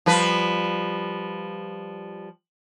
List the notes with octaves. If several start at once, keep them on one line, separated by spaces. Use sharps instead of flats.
F3 G3 B4